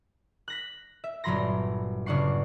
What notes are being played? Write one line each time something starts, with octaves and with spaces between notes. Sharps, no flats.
F#6 A#6 B6
E5
G1 A#2 F#3 B5 C6 A#6
G1 C#3 D4 F#5 C#6 C7